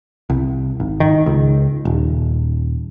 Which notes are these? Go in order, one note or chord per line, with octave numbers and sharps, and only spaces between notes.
C2
G#1
D#3
C#2
D#1